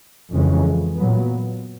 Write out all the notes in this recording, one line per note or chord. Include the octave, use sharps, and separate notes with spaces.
F2 C#3 E3 G#3 C#4
A#2 F#3 B3